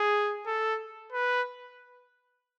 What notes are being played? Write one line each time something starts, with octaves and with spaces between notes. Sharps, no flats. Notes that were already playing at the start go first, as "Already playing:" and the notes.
Already playing: G#4
A4
B4